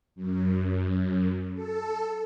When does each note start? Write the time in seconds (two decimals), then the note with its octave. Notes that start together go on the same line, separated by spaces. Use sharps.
0.15 F#2
1.55 A4